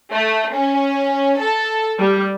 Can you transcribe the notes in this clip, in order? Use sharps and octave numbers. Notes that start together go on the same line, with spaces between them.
A3
C#4
A4
G3